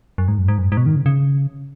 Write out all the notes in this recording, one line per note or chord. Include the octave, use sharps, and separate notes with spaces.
F#2
G#2
F#2
G#2
F#2
G#2
B2
D#3
C#3
C#3